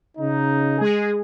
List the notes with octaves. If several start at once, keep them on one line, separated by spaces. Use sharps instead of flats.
C#3 D#4
G#3 G#4